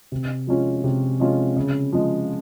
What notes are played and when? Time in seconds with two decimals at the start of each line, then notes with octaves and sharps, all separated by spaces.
0.12 C3
0.47 F3 G#3 C#4 F4
0.84 C3
1.20 F3 G#3 C#4 F4
1.57 C#3
1.93 F3 G#3